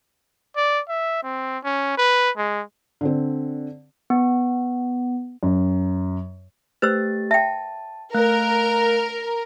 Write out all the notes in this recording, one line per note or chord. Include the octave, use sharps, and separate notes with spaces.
D5
E5
C4
C#4
B4
G#3
D3 C4
B3
F#2
A3 G4 B4 C5 E6 A6
E5 G5 A5
A3 A#4 F5 F#6